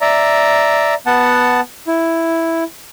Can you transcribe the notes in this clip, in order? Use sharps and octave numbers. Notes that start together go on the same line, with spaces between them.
D5 E5 A#5
B3 F#5 A5
E4